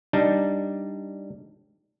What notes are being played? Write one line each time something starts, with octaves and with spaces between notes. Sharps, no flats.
G3 D4 D#4 A5